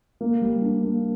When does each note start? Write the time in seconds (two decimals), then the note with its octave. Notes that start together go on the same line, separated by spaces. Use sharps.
0.21 A#3
0.42 G3
0.62 D4
0.83 A#3